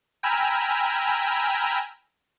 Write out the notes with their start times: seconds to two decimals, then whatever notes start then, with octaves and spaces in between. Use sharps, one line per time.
0.23 G5 G#5 A#5 B5 E6 F6